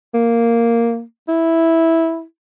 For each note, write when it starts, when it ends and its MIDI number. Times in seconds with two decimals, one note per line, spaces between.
0.14 1.02 58
1.28 2.23 64